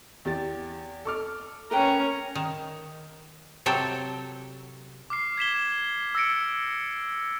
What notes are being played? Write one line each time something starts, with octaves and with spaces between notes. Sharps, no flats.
E2 G4 A6
A4 D6 F6
C#4 A#4 B4 G5 A#5
D#3
C3 F#3 A4 G5
D6 F6 C7
G#6 B6 E7 G7
E6 A6 A#6 C#7 D7